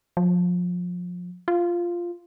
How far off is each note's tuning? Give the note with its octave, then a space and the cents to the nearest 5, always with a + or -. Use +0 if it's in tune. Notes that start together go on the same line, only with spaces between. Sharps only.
F3 +30
F4 -5